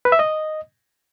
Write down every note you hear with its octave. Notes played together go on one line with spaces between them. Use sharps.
B4
E5
D#5